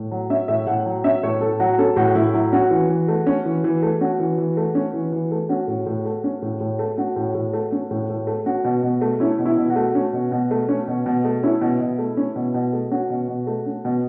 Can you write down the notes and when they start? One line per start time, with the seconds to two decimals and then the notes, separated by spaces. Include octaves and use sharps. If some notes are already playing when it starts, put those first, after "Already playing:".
Already playing: A2
0.11 F#3
0.30 C#4 E5
0.48 A2 E5
0.67 A2 F#5
0.86 F#3
1.04 C#4 E5
1.23 A2 C#5
1.41 A2 A4
1.60 F#3 F#4
1.78 C#4 A4
1.96 A2 F#4
2.15 A2 E4
2.34 F#3 E4
2.53 C#4 F#4
2.71 E3
2.89 E3
3.08 A3
3.27 C#4
3.45 E3
3.64 E3
3.83 A3
4.01 C#4 F#4
4.19 E3
4.38 E3
4.57 A3
4.75 C#4
4.94 E3
5.12 E3
5.31 A3
5.49 C#4 F#4
5.68 A2
5.86 A2
6.06 A3
6.24 C#4
6.42 A2
6.61 A2
6.79 A3
6.98 C#4 F#4
7.16 A2
7.35 A2
7.53 A3
7.72 C#4
7.91 A2
8.10 A2
8.27 A3
8.46 C#4 F#4
8.64 B2
8.83 B2
9.01 A3
9.20 C#4 E4
9.39 B2
9.45 E4
9.58 B2
9.70 F#4
9.76 A3
9.95 C#4
10.13 B2
10.32 B2
10.51 A3
10.69 C#4
10.88 B2
11.06 B2
11.25 A3
11.43 C#4 E4
11.61 B2
11.80 B2
11.99 A3
12.17 C#4
12.36 B2
12.54 B2
12.73 A3
12.91 C#4 F#4
13.10 B2
13.28 B2
13.47 A3
13.66 C#4
13.85 B2